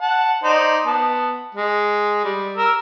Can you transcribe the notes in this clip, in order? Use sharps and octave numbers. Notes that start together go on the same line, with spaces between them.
F#5 A5
D#4 C5 D5
B3 A5
G#3
G3
A#4 E6